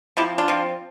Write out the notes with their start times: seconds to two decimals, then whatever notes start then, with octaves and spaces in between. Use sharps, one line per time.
0.17 F3 C4 E4 G4
0.38 D4 F4
0.48 F3 C4